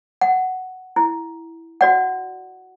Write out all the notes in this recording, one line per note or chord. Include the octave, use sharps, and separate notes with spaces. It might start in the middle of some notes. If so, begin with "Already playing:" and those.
F#5
E4
F#4 D5 F#5